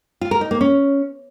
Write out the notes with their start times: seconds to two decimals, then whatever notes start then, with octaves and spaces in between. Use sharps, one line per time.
0.21 F4
0.31 A#4
0.41 D#4
0.51 A#3
0.61 C#4